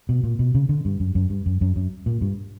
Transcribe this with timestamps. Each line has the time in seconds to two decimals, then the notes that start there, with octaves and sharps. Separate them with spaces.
0.09 B2
0.24 A#2
0.39 B2
0.55 C#3
0.69 D3
0.85 G2
1.00 F#2
1.15 F#2
1.30 G2
1.46 F#2
1.61 F#2
1.76 F#2
2.06 A#2
2.21 G2